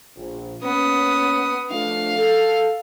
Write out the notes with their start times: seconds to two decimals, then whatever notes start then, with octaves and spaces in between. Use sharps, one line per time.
0.16 A#1
0.63 A#3 B3 C#4 D#6
1.71 F3 A3 D4 F5
2.18 A4